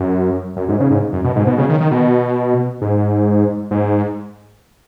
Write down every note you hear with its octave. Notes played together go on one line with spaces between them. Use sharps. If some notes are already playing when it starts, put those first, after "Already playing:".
Already playing: F#2
F#2
G#2
C#3
G#2
F#2
B2
G#2
B2
C#3
D#3
D#3
B2
G#2
G#2